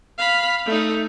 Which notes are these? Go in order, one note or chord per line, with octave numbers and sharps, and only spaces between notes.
F5 B5
A3 D#4